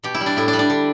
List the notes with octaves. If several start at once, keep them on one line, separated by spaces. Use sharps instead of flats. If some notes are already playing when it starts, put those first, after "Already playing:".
B2 G4
E4
G3
D4
A2 E4
D4
G3
D4
D3